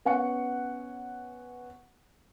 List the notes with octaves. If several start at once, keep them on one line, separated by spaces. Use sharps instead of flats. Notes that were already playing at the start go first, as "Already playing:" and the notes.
B3 C#4 F#5 C#6 C#7